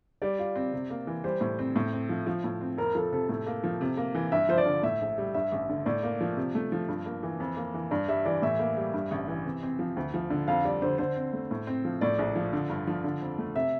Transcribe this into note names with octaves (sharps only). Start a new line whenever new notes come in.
G3 D5
F4
C4
C3
A#3
E3
G3 C5
A2
C4
A2
C4
F3
F3
A2
C4
F2 A#4
F3 A4
C3 A4
A2 A4
A#3
F3
C3
A#3
E3
G2 E5
F3 C5
D5
D3
A2 E5
A#1
G3
G2 E5
A1
D3
A2 D5
A#3
F3
C3
A3
F3
G2
A#3
E3
F2
A#3
E3
G2 D5
G3 E5
E3 D5
A2 E5
A#3
G3
G2
A1
E3
C3
C4
F3
D2
F3
D3
F2 F5
G3 D5
D3 C5
D3 C5
C4
A3
A2
C4
F3
A2 D5
A#1
F3
D3
G2
F3
D3
F2
A3
C3 E5